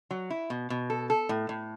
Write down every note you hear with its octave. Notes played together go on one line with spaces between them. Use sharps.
F#3
E4
B2
B2
A4
A4
A2
A2